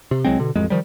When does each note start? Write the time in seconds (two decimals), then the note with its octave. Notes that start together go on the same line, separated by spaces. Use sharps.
0.11 C3
0.25 C2 F#3 G#3 C4
0.39 B2 D3
0.55 A1 F2 G#3
0.70 D#3 F3 G3